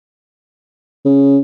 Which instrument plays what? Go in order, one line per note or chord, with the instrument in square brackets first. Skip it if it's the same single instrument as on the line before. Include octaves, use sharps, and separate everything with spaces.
[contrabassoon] C#3